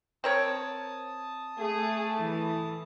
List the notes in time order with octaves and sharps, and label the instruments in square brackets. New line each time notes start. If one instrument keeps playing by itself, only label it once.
[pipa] C4 A#4 C#5 [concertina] A5 D#6
[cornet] A3 [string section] G#4
[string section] E3